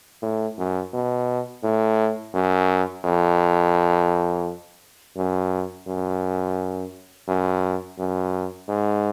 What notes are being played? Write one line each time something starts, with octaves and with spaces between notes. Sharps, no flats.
A2
F#2
B2
A2
F#2
F2
F#2
F#2
F#2
F#2
G#2